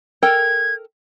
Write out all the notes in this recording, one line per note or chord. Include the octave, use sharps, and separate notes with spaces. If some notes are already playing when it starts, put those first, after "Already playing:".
A4 A#4 G5 G#6